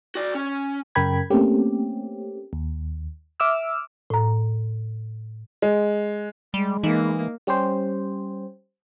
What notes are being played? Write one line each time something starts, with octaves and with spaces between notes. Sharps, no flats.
F#4 D5
C#4
F#2 C#3 A#4 G5 B5 G#6
A3 A#3 C4 C#4 G4
D#2
E5 D6 E6 F6
A2 A#5
G#3
G3 G#3
E3 A#3 D#4
G3 C#4 G4 C5